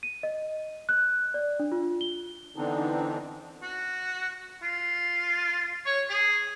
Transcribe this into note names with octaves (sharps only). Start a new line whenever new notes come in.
D#7
D#5
F#6
D5
D4
F4
G7
D3 E3 B3 C4 D4 D#4
F#4
F4
C#5
G#4